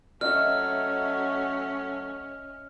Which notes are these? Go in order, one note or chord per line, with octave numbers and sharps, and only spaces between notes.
F#3 A3 C#4 F#4 D#5 E5 F6